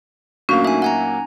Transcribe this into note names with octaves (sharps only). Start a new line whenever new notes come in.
A#2 F#3 A3 A#3 C#4 D4 F#4 F5
D#4 E5 G#5
F#5 G#5 A#5